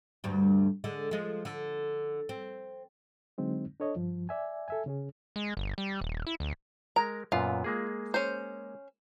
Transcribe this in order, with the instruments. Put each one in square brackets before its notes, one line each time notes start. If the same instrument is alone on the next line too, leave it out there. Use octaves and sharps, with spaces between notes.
[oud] D2 G2 G3
D3 G#3
F3 G#3
D3
C4
[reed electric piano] D3 F#3 G#3 C4 D#4
D4 A4 C#5 D#5
G2 F3
D5 E5 G#5
A4 E5 G#5
C#3 C#4 G#4
[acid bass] G#3
G1
G3
D#1
E4
D2
[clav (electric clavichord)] G#3 A#4 [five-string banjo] A#5
[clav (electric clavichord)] F#2 A#2 B3 [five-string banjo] F4
[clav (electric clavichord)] G#3 A#3 G#4
[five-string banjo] C#4 C5